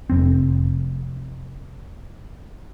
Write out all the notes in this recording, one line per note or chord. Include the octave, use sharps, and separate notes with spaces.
F1 F2 C4